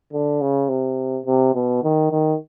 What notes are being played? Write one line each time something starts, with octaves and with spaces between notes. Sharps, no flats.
D3
C#3
C3
C3
B2
D#3
D#3